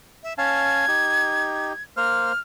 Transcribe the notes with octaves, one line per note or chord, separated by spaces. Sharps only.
E5
C#4 F5 A5 G#6
D#4 G4
A#3 C5 F6